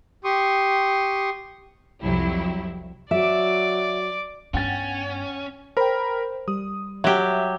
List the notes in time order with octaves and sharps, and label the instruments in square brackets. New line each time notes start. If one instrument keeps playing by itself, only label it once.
[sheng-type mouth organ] G4 C6 C#6 D#6
[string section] C2 F2 F#3 E4 G4
[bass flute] F#3 [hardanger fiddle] D5 D6 [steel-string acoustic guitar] E5
[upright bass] G2 B3 [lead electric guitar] C#4 [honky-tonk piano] F#5 G5 A6
[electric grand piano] A#4 B5 [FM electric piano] C5 G5
[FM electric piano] G3 [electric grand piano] D#6
[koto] F#3 G4 [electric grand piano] E5